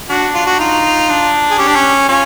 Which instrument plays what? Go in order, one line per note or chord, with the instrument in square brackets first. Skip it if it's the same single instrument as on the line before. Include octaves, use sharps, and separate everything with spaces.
[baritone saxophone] D4 [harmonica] F#4
[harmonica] F4
F#4
[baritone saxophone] D#4 [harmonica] F4
[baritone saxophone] D4
[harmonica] G#4
[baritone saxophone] C#4 [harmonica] G4
[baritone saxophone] D4
C#4
[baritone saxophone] C#4 [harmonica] F4